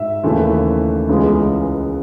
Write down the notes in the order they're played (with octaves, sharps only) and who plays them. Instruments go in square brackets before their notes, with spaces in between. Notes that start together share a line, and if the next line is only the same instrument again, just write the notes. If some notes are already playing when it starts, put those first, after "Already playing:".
Already playing: [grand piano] G#2 E5
D#2 C#3 E3 A3
C#2 C#3 E3 G#3 B3